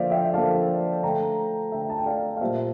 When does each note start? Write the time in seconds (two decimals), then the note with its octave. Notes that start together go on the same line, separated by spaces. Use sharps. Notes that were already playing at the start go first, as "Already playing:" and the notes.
Already playing: D3 F3 A#3 C5 D5 E5 F5
0.10 E5 G5
0.34 D3 F3 A#3 F5 A5
1.03 D3 A3 G5 A#5
1.72 D3 A3 E5 G5
1.90 A5
1.98 G5
2.06 D5 F5
2.37 F5
2.41 A#2 G3 A#3 C5 E5